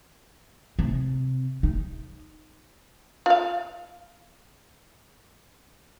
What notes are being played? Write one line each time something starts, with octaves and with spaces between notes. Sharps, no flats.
C3
D#4
F4 F5